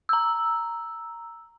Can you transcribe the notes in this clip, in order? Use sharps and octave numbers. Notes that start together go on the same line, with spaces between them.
A#5 E6